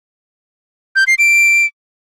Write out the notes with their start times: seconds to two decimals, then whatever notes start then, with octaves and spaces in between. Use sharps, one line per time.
0.96 G6
1.07 C7
1.19 D7